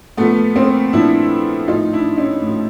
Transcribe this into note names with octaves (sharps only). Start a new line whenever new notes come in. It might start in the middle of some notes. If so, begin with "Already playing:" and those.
A#2 F3 A3 B3
A#3 C4
A#2 F3 D4 E4
A2 F3 D#4 F4
D4 E4
C#4 D#4
A2 F3